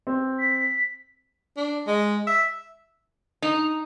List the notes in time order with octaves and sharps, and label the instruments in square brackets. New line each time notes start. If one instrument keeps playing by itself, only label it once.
[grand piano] C4
[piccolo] B6
[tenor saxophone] D4
G#3
E5
[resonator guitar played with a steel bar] D#4